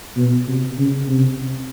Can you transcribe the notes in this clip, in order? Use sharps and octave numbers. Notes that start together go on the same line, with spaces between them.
B2
C3
C#3
C3